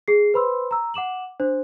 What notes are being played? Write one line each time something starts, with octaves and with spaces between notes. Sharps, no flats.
G#4 C7
B4 C5 B5 C6 E6
A#5 E6
F#5 D6 E7 F#7
D4 C5